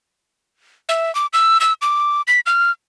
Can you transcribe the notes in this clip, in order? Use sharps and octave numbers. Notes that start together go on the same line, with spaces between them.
E5
D6
E6
E6
D6
B6
F6